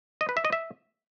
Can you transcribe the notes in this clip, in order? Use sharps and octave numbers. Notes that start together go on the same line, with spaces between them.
D#5
B4
E5
D#5
E5